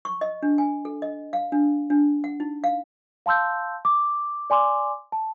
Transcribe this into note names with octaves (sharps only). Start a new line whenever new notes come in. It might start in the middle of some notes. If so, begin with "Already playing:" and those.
C#6
D#5
D4
G#5
A4
D#5
F5
D4
D4
F#5
D#4
F5
F5 A5 C6 E6 G6
D6
D5 G#5 C6 D6
A5